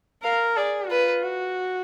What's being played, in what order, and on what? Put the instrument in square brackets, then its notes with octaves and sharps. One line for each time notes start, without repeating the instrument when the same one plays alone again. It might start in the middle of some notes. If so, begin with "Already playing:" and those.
[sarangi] A#4 [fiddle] F5
[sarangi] G#4 [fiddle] D5
[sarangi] F4 [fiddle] B4
[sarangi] F#4